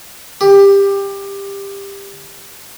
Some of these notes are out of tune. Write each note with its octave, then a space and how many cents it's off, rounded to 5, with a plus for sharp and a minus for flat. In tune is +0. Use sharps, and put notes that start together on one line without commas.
G4 +20